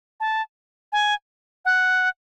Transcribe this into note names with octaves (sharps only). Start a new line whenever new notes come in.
A5
G#5
F#5